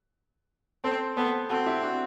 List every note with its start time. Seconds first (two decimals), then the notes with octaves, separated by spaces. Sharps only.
0.84 C4 A4 C5
1.17 B3 A4 C5
1.49 C4 F#4 A4
1.66 E4 G4
1.82 D4 F#4